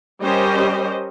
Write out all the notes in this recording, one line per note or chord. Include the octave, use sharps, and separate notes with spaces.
G3 C#4 G4 A#4 C5 D#5